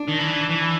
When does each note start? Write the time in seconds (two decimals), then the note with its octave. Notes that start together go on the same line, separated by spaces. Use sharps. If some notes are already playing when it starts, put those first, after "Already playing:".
Already playing: D4
0.08 D#3
0.19 E3
0.50 E3